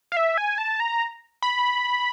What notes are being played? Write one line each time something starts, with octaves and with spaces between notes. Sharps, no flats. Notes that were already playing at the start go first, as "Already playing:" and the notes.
F5
E5
G#5
A5
A#5
B5